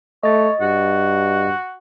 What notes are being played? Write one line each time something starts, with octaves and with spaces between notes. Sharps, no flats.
A3 C#5 D#5 A6
G2 F#4